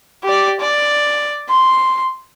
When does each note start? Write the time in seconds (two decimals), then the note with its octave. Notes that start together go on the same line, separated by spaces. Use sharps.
0.24 G4 D5
0.60 D5
1.49 C6